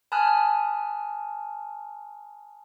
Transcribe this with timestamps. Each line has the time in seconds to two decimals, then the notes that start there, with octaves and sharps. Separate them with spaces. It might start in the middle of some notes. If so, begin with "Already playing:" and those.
0.12 G#5 A5 B5 D#6 F6 F#6